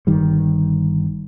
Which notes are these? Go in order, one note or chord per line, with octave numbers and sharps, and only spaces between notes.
G1 D#3 G3